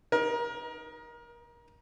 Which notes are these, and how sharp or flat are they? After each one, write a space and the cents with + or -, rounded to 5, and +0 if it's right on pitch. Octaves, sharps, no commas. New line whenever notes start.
D#4 +0 A#4 +25